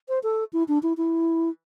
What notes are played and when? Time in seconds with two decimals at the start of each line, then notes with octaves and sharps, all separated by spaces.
0.09 C5
0.23 A4
0.53 E4
0.68 D4
0.83 E4
0.97 E4